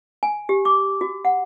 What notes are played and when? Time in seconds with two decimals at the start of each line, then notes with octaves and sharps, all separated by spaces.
0.23 G#5
0.49 G4
0.65 D6
1.01 F#4
1.25 F#5